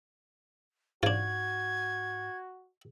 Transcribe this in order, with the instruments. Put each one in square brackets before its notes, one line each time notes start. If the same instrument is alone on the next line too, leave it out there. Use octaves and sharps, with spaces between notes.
[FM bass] G#2 [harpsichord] D4 F4 [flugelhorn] F#4 [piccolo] G#6